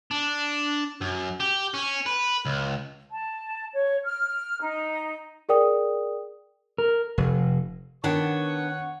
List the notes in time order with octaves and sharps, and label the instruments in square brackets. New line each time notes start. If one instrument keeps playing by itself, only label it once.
[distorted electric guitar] D4
F#2
G4
C#4
B4
C#2
[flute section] A5
C#5
F6
D#4
[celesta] G#4 A#4 D5 G5 D#6
[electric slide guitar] A#4
[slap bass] F1
[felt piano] D#3 [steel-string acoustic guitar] B3 D4 A5 [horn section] C#5 F#5